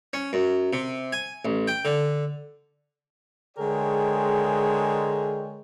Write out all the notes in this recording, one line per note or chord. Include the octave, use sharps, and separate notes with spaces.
C#4
F#2
C3
G#5
A1
G5
D3
D3 G#3 G#4 A#4 C#5 G5